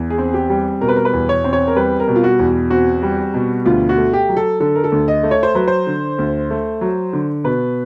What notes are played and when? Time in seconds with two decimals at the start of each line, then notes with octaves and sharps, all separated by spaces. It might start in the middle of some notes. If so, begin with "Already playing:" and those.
Already playing: E2
0.10 G#4
0.18 C4
0.34 G4
0.50 G3
0.81 B2 A#4
0.88 B4
0.96 A#4
1.05 B4
1.13 E2
1.29 C#5
1.44 C4
1.53 C#5
1.67 A#4
1.76 G3 B4
2.00 A#4
2.08 B2
2.16 F4
2.24 F#4
2.39 E2
2.70 C4 F#4
3.03 G3
3.34 B2
3.66 D2 F4
3.89 F#4
3.98 A3
4.13 G4
4.29 F#3
4.37 A4
4.60 D3 A4
4.75 A#4
4.84 A4
4.92 D2
5.08 D#5
5.23 A3
5.31 C#5
5.43 C5
5.55 F#3 B4
5.68 C5
5.87 D3
6.19 D2
6.50 A3
6.81 F#3
7.13 D3
7.44 B2 B4